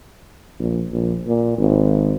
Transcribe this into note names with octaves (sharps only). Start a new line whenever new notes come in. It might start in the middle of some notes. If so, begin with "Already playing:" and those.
A#1
A#1
A#2
G#1